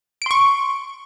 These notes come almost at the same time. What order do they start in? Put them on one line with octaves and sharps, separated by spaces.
D7 C6 C#6